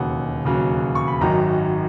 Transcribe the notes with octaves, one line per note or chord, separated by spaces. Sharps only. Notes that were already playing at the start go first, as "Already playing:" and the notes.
Already playing: E1 D#2 C#3 F#3 F#5
E1 D#2 C#3 F#3
C#6
B5
G#1 F#2 D#3 F#3 A#5